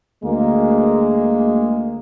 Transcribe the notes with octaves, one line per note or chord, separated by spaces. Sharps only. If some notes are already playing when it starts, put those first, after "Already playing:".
D2 G#3 A#3